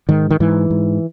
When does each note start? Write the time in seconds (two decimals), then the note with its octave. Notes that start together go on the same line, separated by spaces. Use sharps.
0.09 G#2 D#3
0.30 D#3
0.40 G#2 E3
0.70 G#2